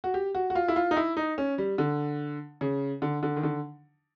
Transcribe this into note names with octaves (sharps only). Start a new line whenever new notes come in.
F#4
G4
F#4
F#4
F4
E4
F4
D#4
E4
D#4
C#4
G3
D3
C#3
D3
D3
D#3
D3